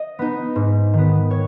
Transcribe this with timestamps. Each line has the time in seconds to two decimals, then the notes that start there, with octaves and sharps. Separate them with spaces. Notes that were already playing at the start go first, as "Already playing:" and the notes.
Already playing: D#5
0.19 B3 D#4
0.56 G#2
0.93 D#3 B3
1.31 C#5